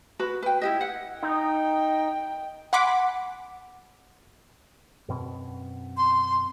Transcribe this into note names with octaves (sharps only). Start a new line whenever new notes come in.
F#4 B4 B5
B4 G5
E4 G4 D#5
F#5
D#4 G5
F#5 G#5 B5 C6 D6 B6
F#2 B2 C4
C6